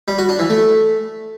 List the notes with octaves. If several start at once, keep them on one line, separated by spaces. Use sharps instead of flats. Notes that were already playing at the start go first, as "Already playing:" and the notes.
G3
F#4
D4
E3
A3